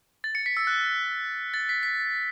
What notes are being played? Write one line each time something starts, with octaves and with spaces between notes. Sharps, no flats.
A6
C#7
B6
E6
F#6
A6
B6
B6